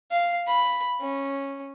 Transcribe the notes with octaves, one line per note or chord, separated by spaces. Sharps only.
F5
B5
C#4